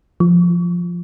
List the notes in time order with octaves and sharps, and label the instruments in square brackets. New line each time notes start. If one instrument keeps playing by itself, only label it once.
[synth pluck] F3